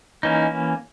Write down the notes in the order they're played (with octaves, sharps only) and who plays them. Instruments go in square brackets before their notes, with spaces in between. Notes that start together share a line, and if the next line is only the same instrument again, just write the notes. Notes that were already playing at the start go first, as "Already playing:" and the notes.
[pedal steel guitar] E3 A#3 C#4 D#4